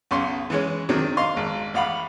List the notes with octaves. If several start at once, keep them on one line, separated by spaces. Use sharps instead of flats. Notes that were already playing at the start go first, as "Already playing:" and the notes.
B1 C#3 C6
E3 G#3 C#4
C3 D#3 F#3 D4
D#5 F5 C6
G#1
A1 F5 F#5 B5